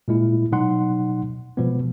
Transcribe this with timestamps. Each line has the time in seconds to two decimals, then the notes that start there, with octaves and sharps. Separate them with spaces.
0.08 A#2 G#3 E4
0.52 B2 F#3 D#4 F#5 C6
1.57 B2 F3 G#3 B3